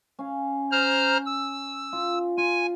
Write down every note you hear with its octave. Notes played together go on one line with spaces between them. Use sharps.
C#4 F5
C5 A#5 F6
E6
F4
F4 G#5